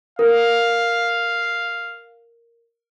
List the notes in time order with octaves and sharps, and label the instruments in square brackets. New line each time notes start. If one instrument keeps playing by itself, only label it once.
[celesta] A#4 [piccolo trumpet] F5